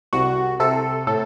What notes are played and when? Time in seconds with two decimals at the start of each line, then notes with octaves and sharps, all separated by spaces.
0.13 C2 F#4
0.60 C3 A4
1.07 A2 A4